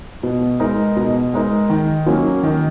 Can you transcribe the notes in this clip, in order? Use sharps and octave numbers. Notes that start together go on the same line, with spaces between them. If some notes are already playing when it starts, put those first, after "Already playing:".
B2
G#3 D#4 A#4
B2
G#3 D#4 A#4
D#3
F#3 A#3 C#4
D#3